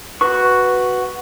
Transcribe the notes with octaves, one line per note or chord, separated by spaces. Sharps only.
F#4 B4 C#6